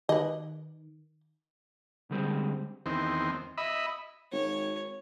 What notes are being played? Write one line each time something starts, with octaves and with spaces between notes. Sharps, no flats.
D#3 B4 D#5
D3 G3 G#3 C4
E2 D#3 C4
D#5 E5 B5
G#1 C#5